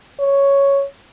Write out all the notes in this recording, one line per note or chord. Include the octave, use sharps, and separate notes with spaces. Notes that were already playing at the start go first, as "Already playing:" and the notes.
C#5